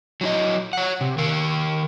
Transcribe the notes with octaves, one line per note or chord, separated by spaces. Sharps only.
F#3 E4 D#5
C#5 F#5
C3
D#3 A#4 F5